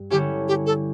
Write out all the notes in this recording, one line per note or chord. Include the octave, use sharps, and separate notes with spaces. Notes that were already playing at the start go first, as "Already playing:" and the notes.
Already playing: G2
D3 G3 C#4 E4 G4
G4
A4